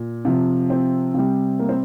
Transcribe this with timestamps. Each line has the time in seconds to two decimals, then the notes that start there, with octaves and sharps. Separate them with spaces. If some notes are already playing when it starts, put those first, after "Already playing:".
Already playing: A#2
0.25 C3 F3
0.70 C4
1.14 C3 G3
1.59 A#3
1.69 C4